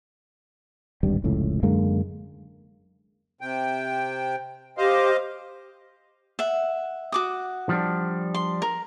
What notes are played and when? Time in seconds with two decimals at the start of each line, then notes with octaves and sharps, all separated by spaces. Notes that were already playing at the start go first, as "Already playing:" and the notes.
1.03 D1 G#1 G2 G3
1.24 F1 C#2 A2
1.63 F#2 D3 G#3 A#3
3.41 C3 G5
4.77 G4 C5 D#5 F5
6.39 E5 F#5
7.12 F#4 D6 D#6
7.69 F3 G3 D4
8.35 C6
8.62 A#4